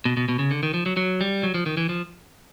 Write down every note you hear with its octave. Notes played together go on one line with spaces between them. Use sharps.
B2
B2
B2
C#3
D3
D#3
F3
F#3
F#3
G3
F#3
F3
D#3
E3
F3